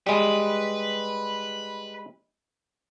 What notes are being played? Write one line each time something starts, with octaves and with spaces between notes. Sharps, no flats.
G3 G#3 B4